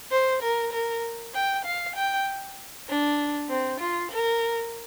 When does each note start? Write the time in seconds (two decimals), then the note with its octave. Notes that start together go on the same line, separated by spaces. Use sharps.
0.11 C5
0.42 A#4
0.72 A#4
1.34 G5
1.65 F5
1.96 G5
2.88 D4
3.49 C4
3.80 F4
4.11 A#4